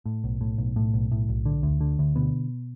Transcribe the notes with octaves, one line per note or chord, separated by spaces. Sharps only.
A2
B1
A2
B1
A2
B1
A2
B1
D3
D2
D3
D2
B2 D3 B3